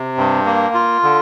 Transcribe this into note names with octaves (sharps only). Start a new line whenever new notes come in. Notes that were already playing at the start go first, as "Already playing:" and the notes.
Already playing: C3
G2
A#3
F4
D3